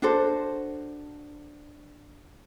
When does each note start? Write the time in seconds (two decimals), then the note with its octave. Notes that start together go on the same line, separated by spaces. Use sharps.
0.02 D4 F#4 A4 C5